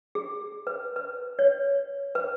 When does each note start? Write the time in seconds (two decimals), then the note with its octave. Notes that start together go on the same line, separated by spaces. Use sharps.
0.15 G#4
0.67 B4
0.96 B4
1.39 C#5
2.15 B4